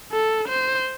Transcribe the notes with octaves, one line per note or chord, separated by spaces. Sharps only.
A4
C5